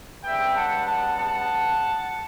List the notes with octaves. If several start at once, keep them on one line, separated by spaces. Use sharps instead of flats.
C#3 G3 B3 E5 G5
F#5 A5
F#5 A5
F#5 A5